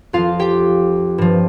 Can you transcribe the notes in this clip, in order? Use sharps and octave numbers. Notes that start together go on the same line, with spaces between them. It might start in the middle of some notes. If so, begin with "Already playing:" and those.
F2 F3 F4 F5
G4 G5
G2 F3